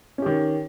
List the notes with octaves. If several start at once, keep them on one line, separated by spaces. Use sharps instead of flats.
D#3 C#4 G4